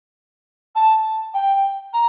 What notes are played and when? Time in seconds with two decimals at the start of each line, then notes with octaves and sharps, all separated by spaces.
0.76 A5
1.34 G5
1.94 A#5